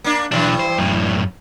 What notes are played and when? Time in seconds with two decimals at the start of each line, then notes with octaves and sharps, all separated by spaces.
0.04 A#3 D4
0.32 B1 G2 E3 D4
0.60 C5
0.78 F#2 A2